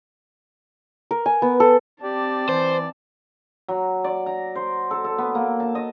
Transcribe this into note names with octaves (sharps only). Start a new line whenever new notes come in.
A#4
G#5
B3
A4
C4 G4 D5 A5
E3 C5
F#3
D5
A#5
C5
A4
A4
B3
A#3
A5
D#5